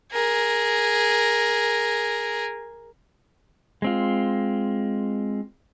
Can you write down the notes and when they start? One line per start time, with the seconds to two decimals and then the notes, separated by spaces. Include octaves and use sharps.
0.12 G#4 A#4
3.82 G#3 C4 F4